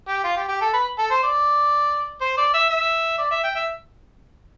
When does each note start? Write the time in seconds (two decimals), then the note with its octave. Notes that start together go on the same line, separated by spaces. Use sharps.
0.08 G4
0.24 F4
0.36 G4
0.48 G4
0.61 A4
0.73 B4
0.98 A4
1.10 C5
1.23 D5
2.21 C5
2.37 D5
2.54 E5
2.70 E5
3.18 D5
3.31 E5
3.44 G5
3.55 E5